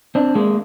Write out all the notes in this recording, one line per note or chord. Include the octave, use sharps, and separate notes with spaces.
C4 D4
G#3 A#3